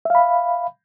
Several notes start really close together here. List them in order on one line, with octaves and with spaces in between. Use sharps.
E5 F5 B5